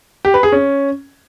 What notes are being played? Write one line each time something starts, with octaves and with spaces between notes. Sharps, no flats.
G4
B4
G#4
C#4